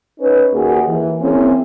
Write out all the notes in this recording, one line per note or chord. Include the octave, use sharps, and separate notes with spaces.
C#4 D#4 B4
D#2 A#3 F#4 G#4
E3
A#3 C4 C#4 E4 G#4